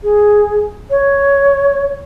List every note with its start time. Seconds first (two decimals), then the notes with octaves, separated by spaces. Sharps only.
0.03 G#4
0.90 C#5